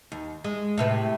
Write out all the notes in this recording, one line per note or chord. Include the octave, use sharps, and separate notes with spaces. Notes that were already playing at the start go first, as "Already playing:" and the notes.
D#2
G#3
A2 C3 B4